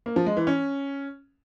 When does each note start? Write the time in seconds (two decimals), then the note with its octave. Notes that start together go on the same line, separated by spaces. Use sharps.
0.06 A#3
0.16 F3
0.26 G#3
0.37 E3
0.47 C#4